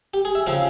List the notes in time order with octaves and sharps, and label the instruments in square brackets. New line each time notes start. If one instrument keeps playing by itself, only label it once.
[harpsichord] G4
G#4
E5
C#3 F3 C4 F5